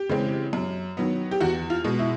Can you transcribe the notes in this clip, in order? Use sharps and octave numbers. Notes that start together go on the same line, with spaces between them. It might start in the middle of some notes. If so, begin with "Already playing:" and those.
Already playing: G4
C#3 E3 G#3 C4
F#2
D#3 F#3 B3
G4
E2 F#4
F4
B2 G#3
E4